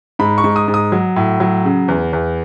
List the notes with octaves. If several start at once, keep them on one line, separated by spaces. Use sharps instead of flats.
G#2 B5
C#6
G#2
D#6
G#2
D#6
F#3
A2
F#3
C#3
E2
E2